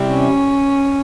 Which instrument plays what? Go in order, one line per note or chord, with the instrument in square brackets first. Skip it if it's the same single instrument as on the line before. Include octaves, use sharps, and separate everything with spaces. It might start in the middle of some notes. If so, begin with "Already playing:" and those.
Already playing: [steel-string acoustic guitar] C3 G3 C4 E4
[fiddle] C#4